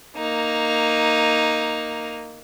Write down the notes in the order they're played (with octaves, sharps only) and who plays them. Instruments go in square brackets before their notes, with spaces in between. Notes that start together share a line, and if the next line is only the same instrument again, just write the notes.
[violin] A#3 D#4